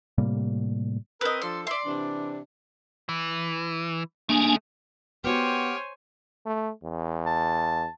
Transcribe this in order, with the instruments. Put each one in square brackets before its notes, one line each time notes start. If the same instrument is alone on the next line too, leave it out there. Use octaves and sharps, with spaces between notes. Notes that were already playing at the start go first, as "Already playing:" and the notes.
[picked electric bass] A2 C3 G3 A#3
[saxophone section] C4 A#4 [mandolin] B4 D#5
[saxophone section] F3 D4 A4 [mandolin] C6
[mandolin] D5 C6 [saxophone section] E5
[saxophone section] C3 E3 D4
[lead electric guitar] E3
[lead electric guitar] A3 G#4 [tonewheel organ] A#3 D4 G#5
[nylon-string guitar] B3 F#4 [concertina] G4 G5 F6 [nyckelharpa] C5 G#5 [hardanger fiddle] C#5
[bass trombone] A3
E2
[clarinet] A5